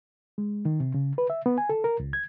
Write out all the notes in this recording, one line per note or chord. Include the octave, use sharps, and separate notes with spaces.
G#3
D#3
C3
C#3
B4
E5
B3
G#5
A4
A#4
C#2
G#6